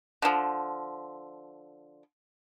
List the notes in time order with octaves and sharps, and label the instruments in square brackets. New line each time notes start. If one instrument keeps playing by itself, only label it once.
[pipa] D3 F3